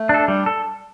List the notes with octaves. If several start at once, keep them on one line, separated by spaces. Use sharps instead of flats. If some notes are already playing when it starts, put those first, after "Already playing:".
Already playing: A3
D4 A4
G3 D4
A4